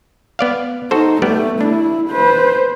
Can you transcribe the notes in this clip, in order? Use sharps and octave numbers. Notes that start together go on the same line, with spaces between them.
B3 D5 F5
D#4 F#4 A4 C5
G3 A3 B3 D5
D4 E4
B4 C5